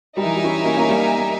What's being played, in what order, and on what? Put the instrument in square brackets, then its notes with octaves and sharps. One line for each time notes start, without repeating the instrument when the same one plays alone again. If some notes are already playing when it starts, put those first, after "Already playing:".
[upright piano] G3 [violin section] D#4 A#4 E5 G#5
[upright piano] E3
G3
C#4 E4
A#3 C#4
A#3 C#4
G3 A#3
A#3